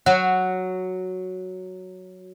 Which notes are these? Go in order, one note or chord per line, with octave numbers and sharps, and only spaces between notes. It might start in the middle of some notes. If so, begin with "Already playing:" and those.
F#3 F#4